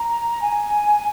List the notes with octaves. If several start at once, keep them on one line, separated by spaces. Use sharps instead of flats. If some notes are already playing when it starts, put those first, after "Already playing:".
Already playing: A#5
G#5